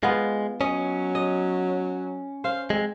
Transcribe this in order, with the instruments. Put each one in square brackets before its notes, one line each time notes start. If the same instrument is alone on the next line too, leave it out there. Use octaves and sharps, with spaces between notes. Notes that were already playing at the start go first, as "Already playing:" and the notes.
[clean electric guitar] G#3 [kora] B3 F4
[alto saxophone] F#3 [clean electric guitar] C#4 [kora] D#5
[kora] D#5
[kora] C5 [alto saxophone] F5
[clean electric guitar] G#3 [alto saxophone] C4